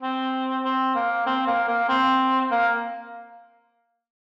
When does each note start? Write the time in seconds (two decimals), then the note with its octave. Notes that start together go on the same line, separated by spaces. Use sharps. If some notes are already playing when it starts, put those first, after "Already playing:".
0.02 C4
0.65 C4
0.95 A#3
1.27 C4
1.47 A#3
1.68 A#3
1.89 C4
2.51 A#3